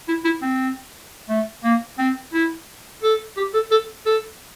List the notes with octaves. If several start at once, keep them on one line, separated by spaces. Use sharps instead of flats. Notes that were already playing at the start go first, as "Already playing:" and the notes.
E4
E4
C4
A3
A#3
C4
E4
A4
G4
A4
A4
A4